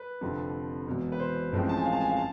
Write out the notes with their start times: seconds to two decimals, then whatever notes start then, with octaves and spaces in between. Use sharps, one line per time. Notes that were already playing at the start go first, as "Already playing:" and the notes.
Already playing: B4
0.21 F1 F2 D3 F3
0.86 E1 E2 B2
1.12 B4
1.20 C5
1.52 A1 A2 F3 G#3 C4
1.69 A5
1.77 G#5
1.85 F5
1.92 A5
2.00 G#5
2.09 F5
2.17 A5